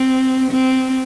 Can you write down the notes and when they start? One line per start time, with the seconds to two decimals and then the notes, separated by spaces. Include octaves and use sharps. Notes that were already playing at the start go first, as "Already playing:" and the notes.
Already playing: C4
0.51 C4